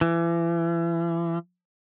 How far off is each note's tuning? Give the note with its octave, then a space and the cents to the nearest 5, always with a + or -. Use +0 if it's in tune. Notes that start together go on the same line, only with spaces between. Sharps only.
E3 +35